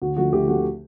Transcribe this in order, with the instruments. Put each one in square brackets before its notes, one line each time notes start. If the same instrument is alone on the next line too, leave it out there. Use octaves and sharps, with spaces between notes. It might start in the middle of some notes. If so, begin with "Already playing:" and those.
[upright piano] D2 F#4
D3 F3 A3 F#4
D2 G4
D3 F3 A3 F#4